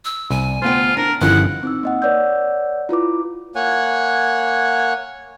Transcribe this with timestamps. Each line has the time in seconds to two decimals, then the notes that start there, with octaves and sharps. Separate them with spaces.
0.05 E6
0.30 C2 G#5
0.62 D2 B3 F4 C5 G5
0.97 D4 A#4
1.21 G1 D#3 F3 C#4 E4 F#5
1.63 C4 D#4 E6
1.83 A#3 D#5 F#5
2.02 B4 C#5 D5 F#5 E6 G6
2.89 E4 F4 B4 D6
3.55 A#3 C#5 F#5 G#5